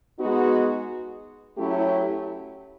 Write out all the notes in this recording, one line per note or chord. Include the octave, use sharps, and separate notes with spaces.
G#3 B3 D#4 F#4
F#3 A3 C#4 E4 G4